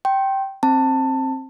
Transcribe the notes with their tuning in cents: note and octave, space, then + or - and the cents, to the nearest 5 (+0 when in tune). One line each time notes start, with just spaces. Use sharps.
G5 -10 C6 +30
C4 +20 A5 +15